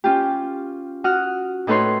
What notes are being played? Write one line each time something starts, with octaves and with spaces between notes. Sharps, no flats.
C#4 F4 G4
F#4 F#5 D#6 F6
A2 D#4 A4 B4 C#5 C6